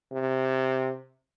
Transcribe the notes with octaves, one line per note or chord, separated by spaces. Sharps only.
C3